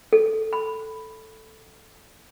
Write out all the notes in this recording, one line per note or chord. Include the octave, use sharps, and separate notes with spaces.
A4
B5